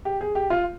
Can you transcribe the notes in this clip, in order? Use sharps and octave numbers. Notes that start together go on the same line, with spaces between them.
G4
G#4
G4
F4